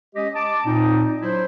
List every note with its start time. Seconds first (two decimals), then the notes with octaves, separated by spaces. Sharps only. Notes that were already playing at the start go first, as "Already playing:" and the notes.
0.15 G#3 C#4 G4 D#5
0.34 A5 D6
0.65 A#2 C4 D#4
1.22 F#3 D4 E4 C5